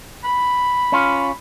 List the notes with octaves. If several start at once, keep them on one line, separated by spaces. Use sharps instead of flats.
B5
C#4 F4